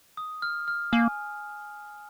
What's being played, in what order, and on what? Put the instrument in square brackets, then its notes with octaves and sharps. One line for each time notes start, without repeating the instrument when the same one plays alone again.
[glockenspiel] D#6
F6
F6
[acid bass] A#3 [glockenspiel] G#5